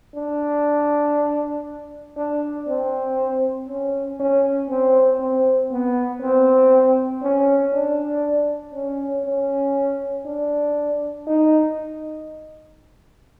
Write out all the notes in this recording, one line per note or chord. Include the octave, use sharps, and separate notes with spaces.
D4
D4
C4
C#4
C#4
C4
C4
B3
C4
C#4
D4
C#4
C#4
D4
D#4